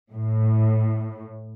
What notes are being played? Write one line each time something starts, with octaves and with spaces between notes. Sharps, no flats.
A2